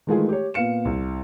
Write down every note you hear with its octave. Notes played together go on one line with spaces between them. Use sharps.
D#3 E3 G#3 A3 F4 G#4
G4 C#5
A#2 B3 F5 C#7 E7
C2